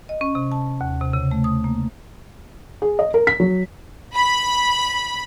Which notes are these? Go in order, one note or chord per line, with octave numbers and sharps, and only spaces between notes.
D#5
C#4
C3
A5
D#2
C3
C#3
A3
D#6
A#3
G#4
D#5
A#4
B6
F#3
B5